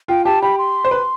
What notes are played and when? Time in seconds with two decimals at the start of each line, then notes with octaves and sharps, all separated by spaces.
0.08 F4 G5
0.25 G4 A5
0.42 G4 B5
0.58 C6
0.85 C5
0.91 B4